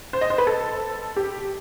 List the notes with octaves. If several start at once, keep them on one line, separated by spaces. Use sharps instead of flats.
C5
D#5
C5
B4
A4
G4